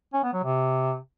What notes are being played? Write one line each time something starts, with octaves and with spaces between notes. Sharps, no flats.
C#4
B3
F#3
C3